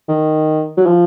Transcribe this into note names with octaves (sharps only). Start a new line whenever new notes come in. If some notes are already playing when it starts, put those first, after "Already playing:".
D#3
F#3
F3